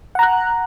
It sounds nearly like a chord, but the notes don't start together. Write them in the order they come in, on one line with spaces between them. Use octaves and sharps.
F#5 A#5 F#6